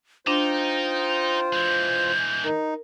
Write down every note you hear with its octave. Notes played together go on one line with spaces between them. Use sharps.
D4 D#4 F4 C5 G5
E3 G#3 G6
D#4 A#4